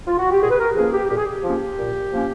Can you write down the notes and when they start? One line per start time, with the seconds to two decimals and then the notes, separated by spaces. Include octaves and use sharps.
0.08 F4
0.18 F#4
0.31 G4
0.42 A#2 G#4
0.51 B4
0.59 A#4
0.76 F3 A#3 C#4 G#4
0.93 G4
1.10 A#2 G4
1.18 G#4
1.25 G4
1.44 F3 A#3 C#4
1.79 A#2
2.13 F3 A#3 C#4